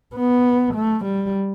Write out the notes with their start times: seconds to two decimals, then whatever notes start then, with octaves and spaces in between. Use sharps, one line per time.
0.15 B3
0.74 A3
1.05 G3